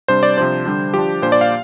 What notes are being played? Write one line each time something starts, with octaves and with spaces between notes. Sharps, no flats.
C3 G3 D4 C5
D5
C3 F3 D4 C5
D3 G3 D4
F3 D4 G4
A#2 A#3 D4 C5
D5
F5